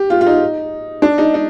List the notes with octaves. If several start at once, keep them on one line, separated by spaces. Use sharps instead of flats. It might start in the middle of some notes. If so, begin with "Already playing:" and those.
Already playing: G4
F4
F4
D#4
D4
D#4
D#4